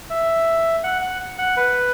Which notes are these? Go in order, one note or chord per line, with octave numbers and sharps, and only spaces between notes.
E5
F#5
F#5
F#5
B4